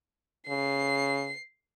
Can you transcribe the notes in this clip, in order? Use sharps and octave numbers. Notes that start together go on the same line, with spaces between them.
C#3 C7